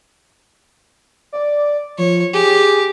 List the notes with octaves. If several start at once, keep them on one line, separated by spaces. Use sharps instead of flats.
D5
F3 C#5
G4 G#4